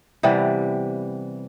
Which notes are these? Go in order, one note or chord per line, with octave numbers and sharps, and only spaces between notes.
C3 E3 G3 B3